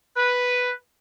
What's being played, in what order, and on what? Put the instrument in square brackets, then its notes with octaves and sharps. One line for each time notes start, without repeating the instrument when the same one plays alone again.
[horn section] B4